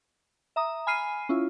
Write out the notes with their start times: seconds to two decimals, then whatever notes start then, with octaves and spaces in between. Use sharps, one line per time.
0.56 E5 A#5 D#6
0.87 G#5 B5 F6 C7 D#7
1.29 C#4 E4 F4